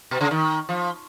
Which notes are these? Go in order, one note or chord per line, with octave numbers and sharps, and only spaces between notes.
B2
C#3
D#3
F3